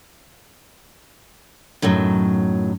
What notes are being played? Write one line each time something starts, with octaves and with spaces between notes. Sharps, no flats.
F#2 A2 D#3 F#3